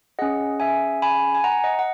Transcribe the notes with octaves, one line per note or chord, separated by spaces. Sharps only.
C#4 G#4 D#5 F#5
E5 G#5
G#5 B5
G#5
F#5 A#5
D#5 F#5
F#5